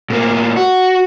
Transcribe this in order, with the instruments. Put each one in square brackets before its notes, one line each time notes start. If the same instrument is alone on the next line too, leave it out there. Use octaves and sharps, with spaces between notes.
[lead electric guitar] A2 A#3
F#4